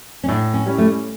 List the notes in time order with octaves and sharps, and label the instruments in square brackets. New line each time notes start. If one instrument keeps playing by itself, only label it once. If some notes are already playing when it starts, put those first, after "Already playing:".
[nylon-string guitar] C#4
[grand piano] A2 [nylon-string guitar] D4
[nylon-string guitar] C#4
[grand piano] G3 C#4 E4 G4
[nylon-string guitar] A3